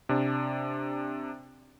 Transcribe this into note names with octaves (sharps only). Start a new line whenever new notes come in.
C3 D4